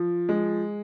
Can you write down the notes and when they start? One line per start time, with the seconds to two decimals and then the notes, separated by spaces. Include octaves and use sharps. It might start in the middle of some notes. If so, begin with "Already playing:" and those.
Already playing: F3
0.29 G#3